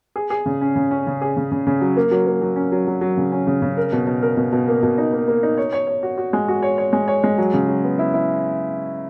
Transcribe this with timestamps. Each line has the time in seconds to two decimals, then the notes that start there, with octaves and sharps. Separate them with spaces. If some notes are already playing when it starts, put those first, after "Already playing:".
0.16 G#4
0.30 G#4
0.46 C#3
0.61 C#4
0.76 C#3
0.91 C#4
1.07 C#3
1.22 G#4
1.37 C#3
1.51 C#3
1.67 C#3
1.81 F#3
1.97 A#3
2.11 F#3
2.27 A#3
2.42 F#3
2.56 C#4
2.72 F#3
2.87 F#3
3.01 F#3
3.17 C#3
3.32 C#4
3.47 C#3
3.62 C#3
3.77 A#4
3.92 B2
4.07 B2
4.22 A#4
4.37 B2
4.52 B2
4.68 A#3
4.83 B2
4.98 D#4
5.13 A#3
5.28 A#3
5.43 D#4
5.58 C#5
5.73 C#5
5.87 C#5
6.03 F#4
6.18 F#4
6.33 G#3
6.48 F#4
6.63 C#5
6.78 C#5
6.93 G#3
7.08 C#5
7.24 G#3
7.38 F#3
7.54 C#3
7.68 F#3
7.84 B3
7.99 E4
8.14 E4